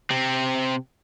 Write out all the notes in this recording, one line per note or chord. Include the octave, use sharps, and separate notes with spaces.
C3 C4